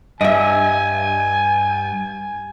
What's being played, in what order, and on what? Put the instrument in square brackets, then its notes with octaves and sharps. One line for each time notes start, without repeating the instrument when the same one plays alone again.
[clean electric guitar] G2 [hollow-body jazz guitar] D#5 E5 [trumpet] G#5